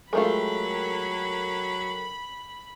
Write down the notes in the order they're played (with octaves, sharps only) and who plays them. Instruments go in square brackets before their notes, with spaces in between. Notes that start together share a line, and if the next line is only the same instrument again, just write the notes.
[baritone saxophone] F#3 [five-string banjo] G#3 A3 F4 [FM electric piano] A4 A#4 G5 [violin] B5